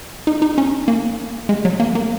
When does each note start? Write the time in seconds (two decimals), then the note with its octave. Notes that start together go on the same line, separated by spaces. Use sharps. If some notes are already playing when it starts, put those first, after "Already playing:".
0.27 D#4
0.42 D#4
0.58 C#4
0.88 A#3
1.49 G#3
1.65 F#3
1.80 A#3
1.95 A#3